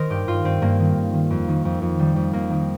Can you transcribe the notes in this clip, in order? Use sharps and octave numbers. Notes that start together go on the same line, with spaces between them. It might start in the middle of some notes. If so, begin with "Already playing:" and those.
Already playing: D#3 A#4 C5 D#5
G2 G4
G2 F4
G2 C4
G2 A#3
D#3
G2
D#3
F2
D#3
F2
F2
D#3 G3
F2
F2 A#3
D#3